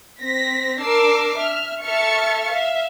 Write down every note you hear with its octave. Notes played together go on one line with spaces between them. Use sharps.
C4 A#6 B6
D4 A#4 D6 E6 C7
E5 F6
A4 E5 C#6 F6 A6 C#7
E5 F5